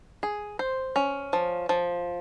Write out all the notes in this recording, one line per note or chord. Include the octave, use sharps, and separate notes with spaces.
G#4
C5
C#4
F3
F3